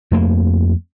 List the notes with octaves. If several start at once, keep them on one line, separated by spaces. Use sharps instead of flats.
F2 A3 A#3